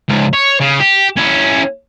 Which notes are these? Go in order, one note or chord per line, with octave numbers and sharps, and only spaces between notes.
C#2 G#2
C#5
C#3
G4
C#4 E4